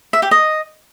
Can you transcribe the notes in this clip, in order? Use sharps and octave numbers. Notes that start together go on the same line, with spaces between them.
E5
G4
D#5